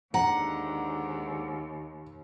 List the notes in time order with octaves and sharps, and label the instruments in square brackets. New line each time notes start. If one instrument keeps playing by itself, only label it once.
[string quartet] D#2 [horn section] G#2 D3 [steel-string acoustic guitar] F#5 [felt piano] A#5